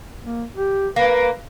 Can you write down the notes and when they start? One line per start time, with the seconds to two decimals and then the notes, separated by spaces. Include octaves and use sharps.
0.23 A#3
0.56 G4
0.96 A#3 B4